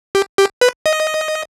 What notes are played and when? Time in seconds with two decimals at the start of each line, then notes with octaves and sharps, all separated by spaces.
0.15 G4
0.38 G4
0.61 B4
0.86 D#5